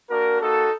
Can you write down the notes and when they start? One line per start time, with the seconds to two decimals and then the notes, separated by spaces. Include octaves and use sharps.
0.10 A#3 D4 F#4 A#4
0.41 A#3 D#4 F#4 A4